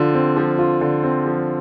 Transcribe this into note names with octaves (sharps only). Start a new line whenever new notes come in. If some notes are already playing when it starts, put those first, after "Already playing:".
Already playing: D3 F3 F4
C4
F3
F4
D3
C4
F3